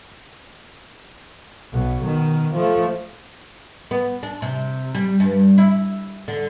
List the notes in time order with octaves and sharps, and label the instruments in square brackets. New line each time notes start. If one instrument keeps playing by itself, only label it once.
[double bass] B1 B2
B2 D#3
F3 A3
[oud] B3
D4
C3
G3
G2
E4
D3